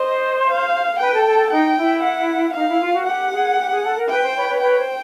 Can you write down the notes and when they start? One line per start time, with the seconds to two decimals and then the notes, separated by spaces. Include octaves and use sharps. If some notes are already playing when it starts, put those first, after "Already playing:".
Already playing: C5 D#5
0.48 F5
1.00 B4 G5
1.13 A4
1.26 A4
1.39 A4
1.51 D#4 G5
1.77 E4
2.03 F#5
2.54 D#4 F5
2.68 E4
2.81 F4
2.94 F#4
3.06 G4 F#5
3.32 G#4
3.58 G4
3.71 G#4
3.84 A4
3.97 A#4
4.09 B4 G5
4.23 C5
4.36 B4 C#5
4.48 B4 C#5
4.61 B4 C#5 G5
4.79 C5